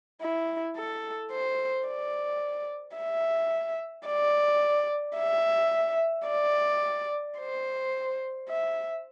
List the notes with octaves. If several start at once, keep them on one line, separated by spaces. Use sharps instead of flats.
E4
A4
C5
D5
E5
D5
E5
D5
C5
E5